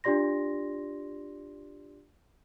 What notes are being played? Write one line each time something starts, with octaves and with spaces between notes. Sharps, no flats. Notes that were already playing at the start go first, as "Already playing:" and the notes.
D4 F4 G4 D5 C6 A#6